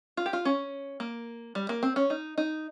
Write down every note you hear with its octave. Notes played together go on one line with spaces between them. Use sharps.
F4
G4
F4
C#4
A#3
G3
A#3
C4
C#4
D#4
D#4